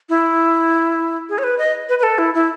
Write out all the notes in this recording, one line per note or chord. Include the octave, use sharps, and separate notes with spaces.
E4
G#4
C#5
B4
D#5
B4
B4
A4
E4
E4